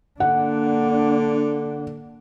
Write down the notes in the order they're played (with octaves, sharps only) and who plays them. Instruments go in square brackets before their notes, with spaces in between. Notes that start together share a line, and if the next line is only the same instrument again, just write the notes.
[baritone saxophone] D3 [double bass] A#3 D4 [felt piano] F#5